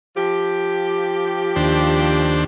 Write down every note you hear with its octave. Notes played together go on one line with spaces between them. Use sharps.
F3 G4
D#2 D4 C5